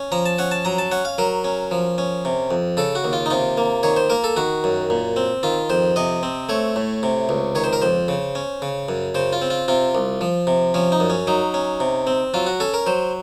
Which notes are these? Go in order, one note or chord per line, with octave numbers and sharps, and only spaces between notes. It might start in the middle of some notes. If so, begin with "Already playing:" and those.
Already playing: C#4
F3 A#5
A5
C#4 F#5
A5
F#3 A#5
A5
C#4 F#5
F5
F#3 A#4
C#4
F3
C#4
C3
F2
C#3 A4
F#4
D#2
F4
D#4
C3 F4
A#3
D#3 C#5
C5
A#3 A#4
A4
D#3 F#4
F#2
A#2
C4
D#3 F4
F2 C5
C3 D#5
C4
A3 C#5
A2
C3
C#2
D#3 C#5
C5
A#4
F2 C5
C#3
C#4
C#3
F#2
C#3 C5
F4
C4
F4
C3 F4
C2
F3
C3
F3 C#4
D#4
F#2
C#4
F#3 D#4
C#4
C3
C4
F#3 F4
F#4
C#4 A4
A#4
F#3 C5